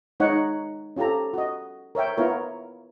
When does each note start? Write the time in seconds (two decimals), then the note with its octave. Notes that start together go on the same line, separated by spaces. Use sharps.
0.20 G#3 D#4 C#5 F#5
0.96 C#4 F4 G4 A4 A#5
1.34 F#4 D#5
1.95 A#4 C#5 E5 G5
2.17 B3 E4 F4 A#4 C#5